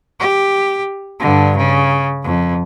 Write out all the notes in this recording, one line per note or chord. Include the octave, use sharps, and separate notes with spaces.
G4
G2 D3
C#3
F2